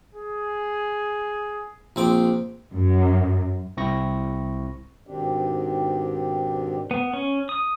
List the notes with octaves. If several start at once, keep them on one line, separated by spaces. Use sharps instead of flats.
G#4
A#1 C4 D6
F#2
C2 C4 E4 C#6 A#6
G#2 B2 D#3 C4 D4 G4
B3
C#4
D#6